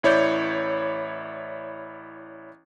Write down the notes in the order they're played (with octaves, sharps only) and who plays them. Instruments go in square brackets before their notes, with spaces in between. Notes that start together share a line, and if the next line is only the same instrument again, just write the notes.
[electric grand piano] A1 E4 C#5 D5 G6